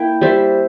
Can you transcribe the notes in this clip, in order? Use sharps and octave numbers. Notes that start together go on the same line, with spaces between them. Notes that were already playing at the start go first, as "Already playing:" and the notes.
Already playing: A#3 E4 G5
G3 C5 E5